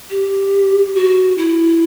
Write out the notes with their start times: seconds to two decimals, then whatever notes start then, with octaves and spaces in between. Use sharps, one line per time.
0.10 G4
0.95 F#4
1.38 E4